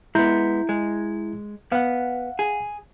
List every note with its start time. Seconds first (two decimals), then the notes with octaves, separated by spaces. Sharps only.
0.15 G#3 B3 E4 A#5 G6
0.69 G#3
1.72 B3 F5 F#5
2.39 G#4